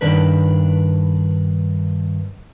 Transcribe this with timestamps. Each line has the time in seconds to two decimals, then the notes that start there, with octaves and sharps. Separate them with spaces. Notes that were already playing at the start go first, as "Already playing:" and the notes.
0.01 G2 D#3 D4 A#4 B4